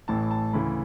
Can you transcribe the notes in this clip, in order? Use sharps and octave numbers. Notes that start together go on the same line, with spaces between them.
A1 A2 E3 A5
A5
D2 C#3 E3 B5